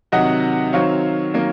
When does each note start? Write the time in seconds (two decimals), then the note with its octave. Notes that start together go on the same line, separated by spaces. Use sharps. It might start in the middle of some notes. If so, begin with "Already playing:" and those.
0.12 C3 D#3 F#3 D#5 F#5
0.73 D#3 F#3 C4 C#5 F5
1.34 D#3 F#3 A#3 C#4